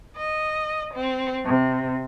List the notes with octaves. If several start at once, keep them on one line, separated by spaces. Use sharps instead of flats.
D#5
C4
C3